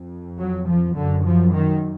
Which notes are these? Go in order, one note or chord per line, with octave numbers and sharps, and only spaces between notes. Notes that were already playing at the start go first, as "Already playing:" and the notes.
Already playing: F2
F#3
F3
F#2 D3
F3
D#3